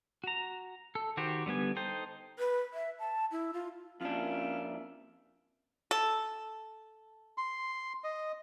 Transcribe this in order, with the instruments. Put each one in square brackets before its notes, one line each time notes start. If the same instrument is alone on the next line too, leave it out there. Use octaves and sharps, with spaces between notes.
[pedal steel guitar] F#4 A#5
A4
D#3 F#4 G4 C5
D3 G3 B3 G#5
D#4 A4 C5 G5
[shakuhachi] B4
E5
A5
E4
F4
[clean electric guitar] F2 D4 [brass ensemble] A#3 E5 [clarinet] C#4 [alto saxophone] F4
[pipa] A4
[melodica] C6
D#5